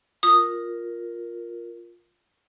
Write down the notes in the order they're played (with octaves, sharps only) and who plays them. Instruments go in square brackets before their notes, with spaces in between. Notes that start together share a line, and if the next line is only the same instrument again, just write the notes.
[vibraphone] F4 A#4 [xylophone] D#6